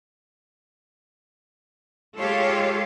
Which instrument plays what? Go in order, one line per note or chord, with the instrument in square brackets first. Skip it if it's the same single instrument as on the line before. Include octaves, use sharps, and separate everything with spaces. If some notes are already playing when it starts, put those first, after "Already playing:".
[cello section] G#3 F4 G4 A4 C#5 F5